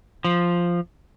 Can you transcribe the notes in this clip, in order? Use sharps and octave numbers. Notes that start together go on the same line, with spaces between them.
F3